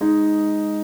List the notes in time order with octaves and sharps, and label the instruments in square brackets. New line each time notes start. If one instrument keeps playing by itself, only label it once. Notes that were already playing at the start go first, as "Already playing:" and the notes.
[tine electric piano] G#3 [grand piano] D#4